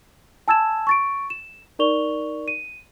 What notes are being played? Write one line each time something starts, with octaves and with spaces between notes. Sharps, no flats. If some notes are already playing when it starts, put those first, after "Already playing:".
G#5 A5 E6 G#6 A6 E7
C#6 A6 D7
E7
D#4 A#4 D5 C#6 F7 G7
D#7